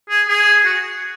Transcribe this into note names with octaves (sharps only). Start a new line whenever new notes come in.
G#4
G#4
F#4